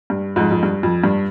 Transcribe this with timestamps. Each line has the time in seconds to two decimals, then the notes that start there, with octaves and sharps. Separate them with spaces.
0.10 G2
0.36 F2 G#2
0.51 F2
0.63 G2
0.83 F2
1.04 G2